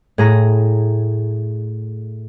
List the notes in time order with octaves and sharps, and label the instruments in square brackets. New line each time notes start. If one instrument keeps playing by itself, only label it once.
[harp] A2 G#4 A#5